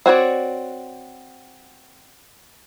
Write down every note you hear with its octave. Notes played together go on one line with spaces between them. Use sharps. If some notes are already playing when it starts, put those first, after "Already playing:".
C4 F#4 C#5 D5